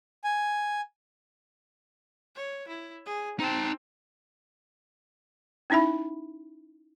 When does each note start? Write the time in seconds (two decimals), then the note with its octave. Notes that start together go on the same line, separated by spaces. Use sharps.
0.24 G#5
2.36 C#5
2.68 E4
3.06 G#4
3.40 C4 D#4 A5
5.70 C#4 D#4 E4 E5 B5